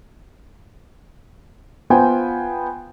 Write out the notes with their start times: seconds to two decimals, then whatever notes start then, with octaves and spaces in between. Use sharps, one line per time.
1.90 B3 F4 C5 G5 G#5